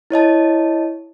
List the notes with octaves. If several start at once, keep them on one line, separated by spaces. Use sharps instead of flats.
E4 C#5 D#5 A5